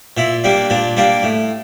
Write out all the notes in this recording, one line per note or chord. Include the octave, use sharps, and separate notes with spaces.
A#2 E4
G3 A#3 D4
A#2 D4
G3 A#3 D4
A2